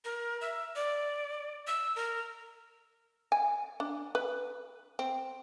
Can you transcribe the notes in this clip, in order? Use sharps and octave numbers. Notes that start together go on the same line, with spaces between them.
A#4
E5
D5
E6
A#4
G#5
D4
B4
C4